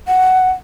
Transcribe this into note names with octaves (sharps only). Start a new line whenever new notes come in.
F#5